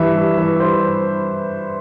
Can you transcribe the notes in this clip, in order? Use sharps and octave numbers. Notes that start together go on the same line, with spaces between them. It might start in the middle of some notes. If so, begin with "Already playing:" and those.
Already playing: G2 E3 E5
G2
E3
G2 C5